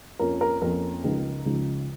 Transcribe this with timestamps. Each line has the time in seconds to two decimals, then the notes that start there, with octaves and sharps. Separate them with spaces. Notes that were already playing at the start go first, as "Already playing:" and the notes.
0.19 F2 F3 A#3 C#4 A#4
0.41 A#4
0.62 F2 F3 A#3 C#4 A#4
1.04 C#2 C#3 F3 G#3 D#4
1.45 C#2 C#3 F3 G#3 D#4